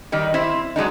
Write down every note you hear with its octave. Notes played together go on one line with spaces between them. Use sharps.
D#3 G3 D#4
C4 E4 C5
F#3 G#3 D4 D#4